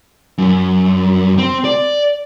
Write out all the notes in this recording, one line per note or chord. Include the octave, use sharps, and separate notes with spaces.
F#2
C4
D5